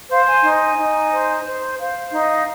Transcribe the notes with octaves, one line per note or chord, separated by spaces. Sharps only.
C5 F5
G#5
D#4
D#4
C5
C5
C5 F5
D#4